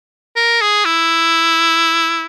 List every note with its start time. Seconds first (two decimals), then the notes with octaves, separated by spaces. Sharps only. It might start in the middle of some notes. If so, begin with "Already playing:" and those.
0.36 A#4
0.62 G#4
0.85 E4